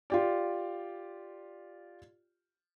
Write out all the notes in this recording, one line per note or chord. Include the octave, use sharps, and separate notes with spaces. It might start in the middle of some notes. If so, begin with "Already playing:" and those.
F4 G4 D5